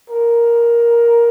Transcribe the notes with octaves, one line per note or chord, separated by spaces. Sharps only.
A#4